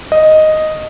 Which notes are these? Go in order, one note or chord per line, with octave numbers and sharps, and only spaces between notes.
D#5